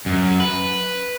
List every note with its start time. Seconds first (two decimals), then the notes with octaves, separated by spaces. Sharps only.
0.06 F#2
0.40 B4